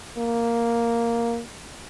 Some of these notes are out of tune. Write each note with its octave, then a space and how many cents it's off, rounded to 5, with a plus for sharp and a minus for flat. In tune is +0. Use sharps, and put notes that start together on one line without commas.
A#3 +0